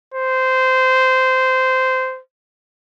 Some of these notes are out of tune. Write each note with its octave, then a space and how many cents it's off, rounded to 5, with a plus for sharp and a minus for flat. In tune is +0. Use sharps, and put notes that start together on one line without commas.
C5 -15